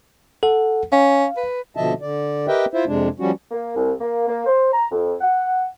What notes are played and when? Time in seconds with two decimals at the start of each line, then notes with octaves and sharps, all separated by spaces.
0.43 A4 F#5
0.92 C#4 F5
1.37 B4
1.76 B2 D3 F3 D#5 E5 A5
2.01 D3 D5
2.48 G4 A#4 B4 D#5 E5 G5
2.74 E4 F4 C5 E5
2.86 F2 C3 G#3 D4
3.20 F3 G3 C#4 F#4
3.52 A#3
3.75 C2
4.00 A#3
4.28 A#3
4.46 C5
4.73 A#5
4.92 F2
5.21 F#5